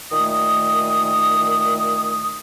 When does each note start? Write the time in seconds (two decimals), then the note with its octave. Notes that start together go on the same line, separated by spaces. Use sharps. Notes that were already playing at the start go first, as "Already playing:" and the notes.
0.11 A#2 D#3 A3 D#6